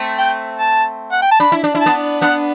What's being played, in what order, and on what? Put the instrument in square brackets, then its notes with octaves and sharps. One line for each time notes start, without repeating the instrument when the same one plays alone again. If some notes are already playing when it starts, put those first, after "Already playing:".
Already playing: [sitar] A3 C4
[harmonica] G5
A5
F#5
G5
A5
[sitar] D4 [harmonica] B5
[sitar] E4
D4
E4
[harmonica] A5
[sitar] B3 D4
[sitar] B3 D4 [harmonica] F#5